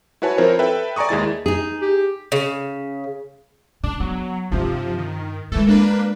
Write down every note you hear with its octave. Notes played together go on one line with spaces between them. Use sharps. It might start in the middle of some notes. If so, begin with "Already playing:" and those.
E4 F#4 B4 C#5 G#5 A5
F3 C4 E4 A#4 C5 C#5
A4 B4 E5 G5
D5 G#5 A#5 C#6 D#6
D#2 G#3 E4 A6
D#4 G#4
G4
C#3
C#3 D4
F#3 B3
G2 C3 F3 D#4
D#3
E3 G#3 A3 F4 A4
A#3 D4 B4